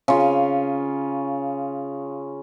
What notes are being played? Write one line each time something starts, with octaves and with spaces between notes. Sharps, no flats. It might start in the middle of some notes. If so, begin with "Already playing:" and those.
C#3 F4